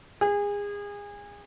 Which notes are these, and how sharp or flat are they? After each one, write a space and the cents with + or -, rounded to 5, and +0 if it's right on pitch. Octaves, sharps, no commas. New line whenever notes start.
G#4 -30